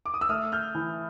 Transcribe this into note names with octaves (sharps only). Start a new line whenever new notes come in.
D6
D#6
E6
A3 D#6 F6
F6 G6
E3